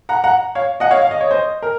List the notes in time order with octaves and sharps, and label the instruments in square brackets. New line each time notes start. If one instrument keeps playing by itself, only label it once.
[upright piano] F#5 A#5
F#5 A#5
C#5 F5
D#5 F#5
C#5 F5
F5
D#5
C#5
C5 D#5
A#4